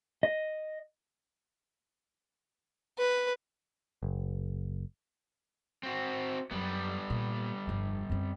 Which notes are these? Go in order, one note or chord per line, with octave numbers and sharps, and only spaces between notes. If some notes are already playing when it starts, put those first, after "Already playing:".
D#5
B4
F#1
C4 F#4
F#2 G3 B3
A#2
G1 F2
F#2 C4